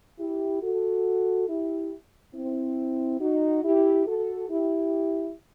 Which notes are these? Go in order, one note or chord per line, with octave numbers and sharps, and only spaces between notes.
E4 G4
F#4 A4
E4 G4
C4 E4
D#4 F#4
E4 G4
F#4 A4
E4 G4